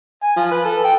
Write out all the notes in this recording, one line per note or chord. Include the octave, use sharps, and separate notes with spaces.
G#5
F3
B4
A4
G5